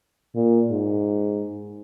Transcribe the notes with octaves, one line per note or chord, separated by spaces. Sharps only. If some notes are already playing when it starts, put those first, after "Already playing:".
A#2
G#2